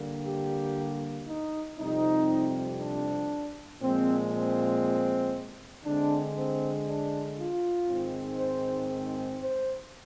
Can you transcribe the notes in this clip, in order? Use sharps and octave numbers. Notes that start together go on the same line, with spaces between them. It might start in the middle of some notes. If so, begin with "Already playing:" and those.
Already playing: D3 G3 A#3
G4
D#4
F2 C3 G3 C4 D#4
D4
A#2 F3 G#3 C4
C4
D3 G#3 C4 D4
C4
D4
F4
G#2 D#3 G#3 C4
C5
C5